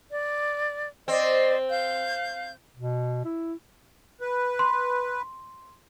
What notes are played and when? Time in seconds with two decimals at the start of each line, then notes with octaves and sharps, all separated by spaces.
0.11 D5
1.08 C4 C5 D5 D#5
1.70 F5 G6
2.77 B2
3.25 E4
4.21 B4
4.59 C6